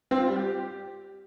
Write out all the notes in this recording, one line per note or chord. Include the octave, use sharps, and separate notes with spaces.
C4
F4
G3
G4